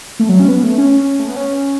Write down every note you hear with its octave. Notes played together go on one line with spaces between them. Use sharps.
A3
F#3
C#4
B3
A3
C#4
A3
B3
C#4